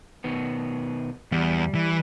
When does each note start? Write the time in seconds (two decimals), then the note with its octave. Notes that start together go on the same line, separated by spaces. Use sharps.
0.24 B2 D#3 B3
1.32 E2 G3
1.75 E3